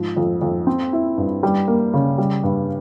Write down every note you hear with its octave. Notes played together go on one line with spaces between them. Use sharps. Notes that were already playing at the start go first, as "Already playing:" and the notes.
Already playing: G#2 F3
F2
F2
C4
E4
G2
G3
A#3
C#3
G3
G2